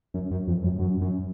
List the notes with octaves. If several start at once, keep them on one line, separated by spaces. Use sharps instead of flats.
F#2
F#2
F2
F#2
F#2
F#2